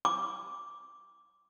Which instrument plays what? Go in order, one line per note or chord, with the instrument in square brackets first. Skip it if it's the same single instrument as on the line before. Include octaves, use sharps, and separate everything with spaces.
[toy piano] D6